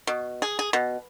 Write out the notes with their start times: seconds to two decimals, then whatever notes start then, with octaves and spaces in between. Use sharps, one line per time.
0.07 B2
0.42 G#4
0.59 G#4
0.73 B2